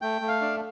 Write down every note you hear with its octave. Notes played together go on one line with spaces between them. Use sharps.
A3 G5
A3
F5
D4